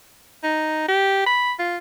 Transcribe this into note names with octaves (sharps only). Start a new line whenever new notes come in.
D#4
G4
B5
F4